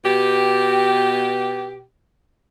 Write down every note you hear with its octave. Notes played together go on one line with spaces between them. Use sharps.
B2 G4